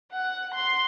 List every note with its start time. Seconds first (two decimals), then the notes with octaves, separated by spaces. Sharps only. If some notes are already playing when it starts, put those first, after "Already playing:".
0.12 F#5
0.54 C6